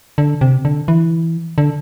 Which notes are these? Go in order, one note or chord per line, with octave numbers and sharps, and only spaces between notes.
D3
C3
D3
E3
D3